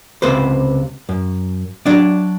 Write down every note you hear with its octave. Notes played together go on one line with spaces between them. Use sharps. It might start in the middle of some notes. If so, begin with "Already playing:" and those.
C#2 C3 B4 C5
F#2
F#3 D4 D5